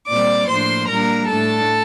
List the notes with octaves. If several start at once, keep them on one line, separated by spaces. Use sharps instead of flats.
A#2 G3 C4 D5 D6
A2 F3 A#3 D4 C5 C6
A#2 G3 A#3 D4 A#4 A#5
A2 A3 D4 A4 A5